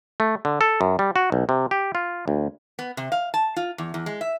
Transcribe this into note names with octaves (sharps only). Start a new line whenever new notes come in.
A3
D3
A4
F#2
G3
F#4
B1
C3
G4
F4
D2
B3
C3
F5
A5
F4
E2
E2
G#3
E5